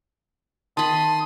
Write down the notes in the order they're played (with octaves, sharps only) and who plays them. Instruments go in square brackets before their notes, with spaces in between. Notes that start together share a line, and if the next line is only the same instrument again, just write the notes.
[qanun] D#3 B5 [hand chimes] A5 [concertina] C6 D#6